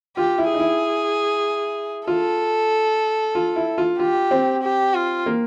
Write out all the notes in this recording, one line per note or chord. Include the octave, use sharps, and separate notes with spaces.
F4 G4
E4
D#4 G#4
E4
F4 A4
F4
E4
F4
F4 G4
C4
G4
F4
A#3